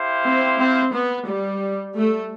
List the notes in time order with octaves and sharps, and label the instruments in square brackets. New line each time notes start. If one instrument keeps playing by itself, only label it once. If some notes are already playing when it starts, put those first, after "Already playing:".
Already playing: [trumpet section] E4 G4 C5 F5
[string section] C4
C4
B3
G3
A3